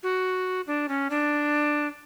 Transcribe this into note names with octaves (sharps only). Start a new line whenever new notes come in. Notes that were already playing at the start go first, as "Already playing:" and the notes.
F#4
D4
C#4
D4